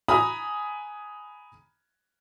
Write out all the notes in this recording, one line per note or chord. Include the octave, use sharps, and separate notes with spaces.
G#5 A#5 B5 D#6